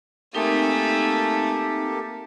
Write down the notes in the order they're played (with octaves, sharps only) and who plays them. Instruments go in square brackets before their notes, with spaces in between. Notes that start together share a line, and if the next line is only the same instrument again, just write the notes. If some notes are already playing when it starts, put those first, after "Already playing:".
[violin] A3 G#5 [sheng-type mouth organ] A#3 G4 A4 [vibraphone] C4 D#4 A#4